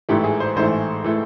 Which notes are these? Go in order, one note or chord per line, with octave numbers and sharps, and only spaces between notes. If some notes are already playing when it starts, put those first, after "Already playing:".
A1 G#2 E3 A3 G4
G#4
C5
A1 G#2 E3 A3 C5
E3 A3